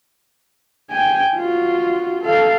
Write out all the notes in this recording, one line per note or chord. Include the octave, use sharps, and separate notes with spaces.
G5 G#5
F4 F#4
A4 F5